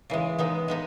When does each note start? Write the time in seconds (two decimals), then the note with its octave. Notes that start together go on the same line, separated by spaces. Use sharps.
0.10 C#3 E3 G#3
0.39 G#3 B3 D#4
0.68 G#3 B3 D#4